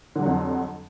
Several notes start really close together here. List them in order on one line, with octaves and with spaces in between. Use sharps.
D3 G3 F#3 F2